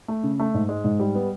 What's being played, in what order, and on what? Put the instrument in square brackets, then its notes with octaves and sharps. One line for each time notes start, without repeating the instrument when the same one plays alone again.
[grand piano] A3
C#3
A3
G#2
G#3
G#2
G3
B3